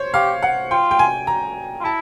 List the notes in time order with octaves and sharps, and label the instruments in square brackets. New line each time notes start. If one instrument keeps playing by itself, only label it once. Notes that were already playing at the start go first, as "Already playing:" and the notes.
Already playing: [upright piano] C5 C#5
[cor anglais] G4 [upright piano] F5
[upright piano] F#5
[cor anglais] F4 [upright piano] G5
[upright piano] G5
G#5
A#5
[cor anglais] F4
[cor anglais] E4 [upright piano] A5